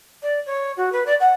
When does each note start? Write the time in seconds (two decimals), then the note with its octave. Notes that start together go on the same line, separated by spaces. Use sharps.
0.22 D5
0.46 C#5
0.77 F#4
0.92 B4
1.06 D5
1.20 F#5